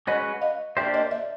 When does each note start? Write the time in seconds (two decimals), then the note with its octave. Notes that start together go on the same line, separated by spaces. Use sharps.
0.07 G#3 C#4 F#4 B4 C#5 D#5
0.42 D#5 F5
0.77 A#3 D4 G4 C5 D5 E5
0.94 C#5 D#5
1.11 D5 E5